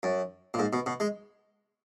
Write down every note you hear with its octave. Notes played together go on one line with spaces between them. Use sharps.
F#2
A#2
G#2
B2
B2
G#3